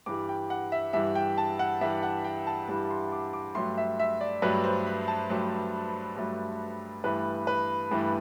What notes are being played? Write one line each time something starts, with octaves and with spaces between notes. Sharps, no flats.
G2 E3 G3 D6
G5
F#5
E5
G2 E3 G3 E5
G5
A5
F#5
G2 E3 G3 E5
F#5
G5
A5
G2 E3 G3 B5
C6
D6
D6
G2 F#3 A3 C6
E5
E5
D5
G2 F#3 A3 B4
C5
B5
A5
G2 F#3 A3
G2 F#3 A3
G2 E3 A3 B4
B4
G2 E3 A3